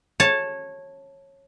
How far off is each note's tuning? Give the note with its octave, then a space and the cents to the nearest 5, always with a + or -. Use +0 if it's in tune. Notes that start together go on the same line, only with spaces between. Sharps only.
C#5 -15 A5 +0